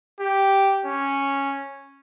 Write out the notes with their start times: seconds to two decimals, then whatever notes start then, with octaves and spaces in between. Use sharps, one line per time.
0.20 G4
0.86 C#4